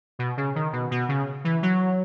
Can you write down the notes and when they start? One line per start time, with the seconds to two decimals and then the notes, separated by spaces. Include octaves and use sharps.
0.19 B2
0.37 C#3
0.55 D#3
0.73 B2
0.91 B2
1.09 C#3
1.44 E3
1.62 F#3